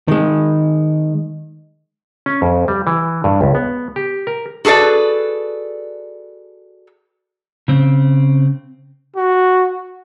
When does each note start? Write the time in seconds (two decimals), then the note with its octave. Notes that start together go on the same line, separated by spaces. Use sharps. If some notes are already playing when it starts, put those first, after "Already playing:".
0.08 D#3 G#3
2.26 C#4
2.42 F2
2.68 G3
2.87 E3
3.24 G2
3.41 C#2
3.55 B3
3.96 G4
4.27 A#4
4.65 F#4 G#4 A4 B4 D5
7.68 C#3 C4
9.16 F#4